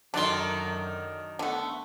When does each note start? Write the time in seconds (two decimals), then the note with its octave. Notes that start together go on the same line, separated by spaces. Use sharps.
0.14 F#2 D3 D#3 F#3 D4 C6
1.39 D3 A3 B3 F#5